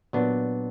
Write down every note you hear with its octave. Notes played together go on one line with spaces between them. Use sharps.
A#2 F#3 B3 D4